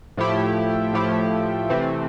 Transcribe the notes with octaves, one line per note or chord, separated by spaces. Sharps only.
A2 F3 A3 E4 G4
A2 F3 A3 E4 G4
C3 E3 A3 C4